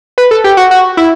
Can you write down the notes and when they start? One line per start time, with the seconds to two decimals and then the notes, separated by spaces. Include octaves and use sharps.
0.18 B4
0.31 A4
0.44 G4
0.57 F#4
0.71 F#4
0.97 E4